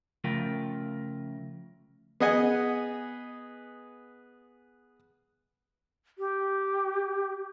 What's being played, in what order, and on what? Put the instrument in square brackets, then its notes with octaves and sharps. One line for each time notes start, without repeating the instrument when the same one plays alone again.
[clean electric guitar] C#3 F3 A3 F4 A#4 G5
[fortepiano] B3 G#4 D#5 F#5 G#5
[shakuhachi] G4